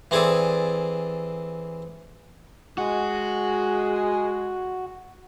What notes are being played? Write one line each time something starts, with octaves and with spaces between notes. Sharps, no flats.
E3 C4 G#4 A4 D5
G#3 F#4